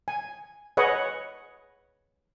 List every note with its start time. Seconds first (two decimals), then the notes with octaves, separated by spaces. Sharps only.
0.08 G#5
0.77 G#4 B4 C#5 D#5 F#5